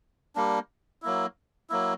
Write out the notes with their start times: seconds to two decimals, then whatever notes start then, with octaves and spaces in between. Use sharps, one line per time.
0.35 G3 A#3 D4
1.02 F#3 A#3 E4
1.70 F#3 A#3 E4